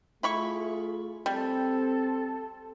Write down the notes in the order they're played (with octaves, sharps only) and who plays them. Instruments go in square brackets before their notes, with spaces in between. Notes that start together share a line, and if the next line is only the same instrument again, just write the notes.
[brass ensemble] A3 F4 G#4 [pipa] E4 B5 C#6
[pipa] G3 [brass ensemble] C4 [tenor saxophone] A4